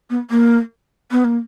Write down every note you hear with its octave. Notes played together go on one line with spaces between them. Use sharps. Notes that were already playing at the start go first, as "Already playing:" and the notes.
B3
A#3
B3
A#3